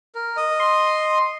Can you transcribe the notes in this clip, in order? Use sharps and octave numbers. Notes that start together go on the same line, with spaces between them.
A#4
D#5
C6